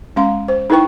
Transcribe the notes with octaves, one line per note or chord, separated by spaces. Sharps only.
G#3 C#4 F5 C6
C5
D#4 E4 A4 B4 G5 C#6